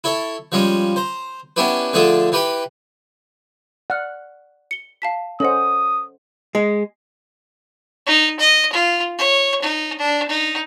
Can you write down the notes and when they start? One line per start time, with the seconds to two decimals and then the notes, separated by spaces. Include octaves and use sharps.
0.04 E4 A4 C#5
0.52 F3 G3 G#3 C#4
0.96 C5 A#5
1.56 B3 C#4 D4 E4 G4 B4
1.93 D3 F3 A3 D4 G#4 A4
2.32 E3 G4 B4 G5 B5
3.90 D5 F#5 F6
4.71 C#7 G7
5.02 F5 A5 B6
5.40 C#4 A4 C5 D#5 F#5 D#6
6.55 G#3
8.06 D#4
8.40 D#5
8.72 F4
9.18 C#5
9.62 D#4
9.98 D4
10.28 D#4